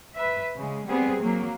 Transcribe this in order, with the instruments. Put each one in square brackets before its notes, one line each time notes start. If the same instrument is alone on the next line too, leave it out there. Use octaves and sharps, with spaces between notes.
[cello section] B4 E5
C#3 G#3
G3 B3 C4 G#4
F#3 A#3